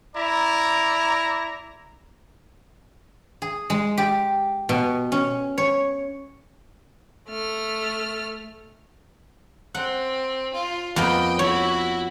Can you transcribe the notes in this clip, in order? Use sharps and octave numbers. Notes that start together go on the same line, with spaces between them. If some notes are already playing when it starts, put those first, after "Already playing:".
E4 D5 A#5
G#4
G#3
G4
B2
C#4
C#5
A3 F6
C4 F#5
F4
F2 A#3 B3 D#5 G5
E4 F#4 C#5